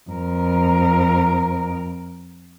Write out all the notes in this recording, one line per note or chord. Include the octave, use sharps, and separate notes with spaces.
F2 A#4